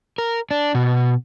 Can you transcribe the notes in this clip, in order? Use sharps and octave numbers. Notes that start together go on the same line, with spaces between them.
A#4
D4
B2